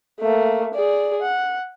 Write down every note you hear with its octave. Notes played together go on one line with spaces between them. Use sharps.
A3 A#3
G#4 D5
F#5